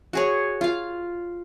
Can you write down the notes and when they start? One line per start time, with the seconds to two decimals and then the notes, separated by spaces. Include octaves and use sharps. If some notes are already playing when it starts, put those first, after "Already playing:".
0.13 F#4 G#4 C#5
0.61 F4 F5